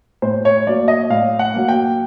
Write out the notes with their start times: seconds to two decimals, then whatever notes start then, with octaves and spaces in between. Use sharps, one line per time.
0.22 A2 C5
0.45 C#5
0.67 F#3 A#3 D5
0.88 D#5
1.10 A2 F5
1.39 F#5
1.53 F#3 A#3
1.68 G5